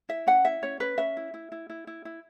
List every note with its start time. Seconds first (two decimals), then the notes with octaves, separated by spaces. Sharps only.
0.09 E4 E5
0.27 C#4 F#5
0.45 E4 E5
0.63 C#4 C#5
0.80 C#4 B4
0.98 C#4 E5
1.17 E4
1.34 E4
1.52 E4
1.70 E4
1.87 E4
2.05 E4